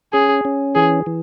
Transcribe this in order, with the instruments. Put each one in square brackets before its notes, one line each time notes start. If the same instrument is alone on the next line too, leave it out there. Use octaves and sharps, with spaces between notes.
[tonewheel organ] C#4 [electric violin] G#4
[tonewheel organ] C#4
[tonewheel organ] E3 [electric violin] G#4
[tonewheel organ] E3